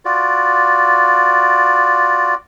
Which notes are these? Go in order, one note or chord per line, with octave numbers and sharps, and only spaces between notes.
F4 F#4 D5